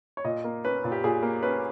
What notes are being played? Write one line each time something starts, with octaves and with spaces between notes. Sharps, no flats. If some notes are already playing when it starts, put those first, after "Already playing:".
C#5
A#2 D#5
A#3
C#4 B4
A#2
G4
A#2 G#4
A#3
C#4 B4